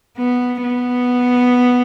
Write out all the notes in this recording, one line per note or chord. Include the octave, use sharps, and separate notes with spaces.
B3
B3